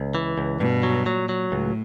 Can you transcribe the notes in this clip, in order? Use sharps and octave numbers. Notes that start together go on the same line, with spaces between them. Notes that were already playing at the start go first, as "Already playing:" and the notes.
Already playing: C#2
E3
C#2
G2 B2
F#3
A#2 F#3
F#3
C#2 A2